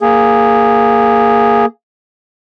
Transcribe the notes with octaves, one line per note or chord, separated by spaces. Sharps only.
A#3 G#4